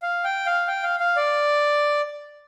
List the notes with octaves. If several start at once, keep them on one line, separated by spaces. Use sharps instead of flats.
F5
G5
F5
G5
F5
F5
D5